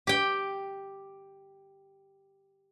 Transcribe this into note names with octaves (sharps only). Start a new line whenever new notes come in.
G4 G5